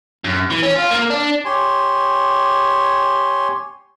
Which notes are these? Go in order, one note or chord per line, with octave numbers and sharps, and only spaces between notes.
F#2
E3
C#4
F4
A#3
D4
G4 C#5 G#5 C6